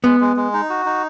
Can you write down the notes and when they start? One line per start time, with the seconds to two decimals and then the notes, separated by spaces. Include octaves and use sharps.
0.04 G#3 B3
0.20 G#3
0.37 G#3
0.54 D#4
0.70 F#4
0.86 D#4